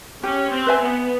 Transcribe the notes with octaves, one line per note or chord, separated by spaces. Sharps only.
C#4 G4
C4
B4 E5 G#5
B3